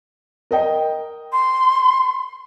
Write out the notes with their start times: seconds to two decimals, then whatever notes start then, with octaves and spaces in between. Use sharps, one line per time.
0.51 A#4 D#5 G5
1.32 C6